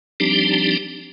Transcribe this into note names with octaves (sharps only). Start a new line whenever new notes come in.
F3 G3 C4 D4 D#4 G4